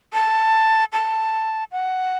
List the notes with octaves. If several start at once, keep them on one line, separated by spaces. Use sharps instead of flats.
A5
A5
F#5